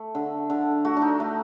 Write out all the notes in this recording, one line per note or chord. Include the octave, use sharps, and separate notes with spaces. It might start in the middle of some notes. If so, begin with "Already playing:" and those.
Already playing: A3
D3
D3
A3 F#4
D4
D#4
A3